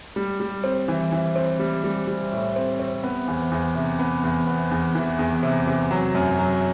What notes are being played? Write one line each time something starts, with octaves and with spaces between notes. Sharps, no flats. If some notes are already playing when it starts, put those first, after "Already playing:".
G3
G3
C4
E3
E3
C4
G3
G3
G3
A2
C4
C4
B3
E2
E2
C3
B3
E2
B3
E2
E3
E2
C3
C3
F#3
F#2
F#3